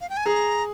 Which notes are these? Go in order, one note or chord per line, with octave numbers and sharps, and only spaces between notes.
F5
G5
G#5
G#4 A#5